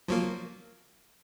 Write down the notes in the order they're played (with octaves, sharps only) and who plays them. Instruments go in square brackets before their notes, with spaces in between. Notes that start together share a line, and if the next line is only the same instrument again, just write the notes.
[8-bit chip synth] F3 F#3 A#3